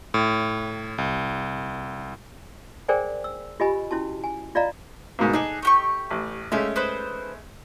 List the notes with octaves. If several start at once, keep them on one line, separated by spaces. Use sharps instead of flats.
A2
C2
G#4 A#4 C5 D5 G5 G#5
E6
F4 G4 D#5 G#5 B5
C#4 E4 F#4 A5
G#5
F4 D5 D#5 F5 A#5
G#2 B2 A#3
D4 D#4 G#4 A4
A3 G4 C#6
A1
G#3 A3 C#4 G4 E5 F5
D#4 B4 C5